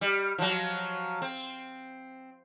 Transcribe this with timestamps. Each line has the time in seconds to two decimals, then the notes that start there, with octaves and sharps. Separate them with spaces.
0.01 G3
0.38 F3 F#3
1.22 C4